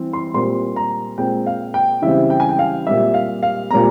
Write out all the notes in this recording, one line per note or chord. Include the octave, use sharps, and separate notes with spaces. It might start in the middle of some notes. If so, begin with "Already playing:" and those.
Already playing: E3 G3 C4
C6
A#2 G3 C4 C6
A#5
A#2 G#3 C4 G5
F5
G5
C#3 E3 G3 C4 E5
G5
G#5
G5
F5
A#2 G3 C4 E5
F5
F5
A#2 G3 C4 A#5